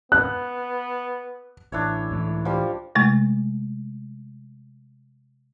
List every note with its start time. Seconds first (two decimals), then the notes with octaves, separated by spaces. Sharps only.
0.12 B3 F#6
1.72 A1 D4 E4 C#5
2.11 C#2 A2 E3
2.45 F3 G3
2.95 C3 G#3 A3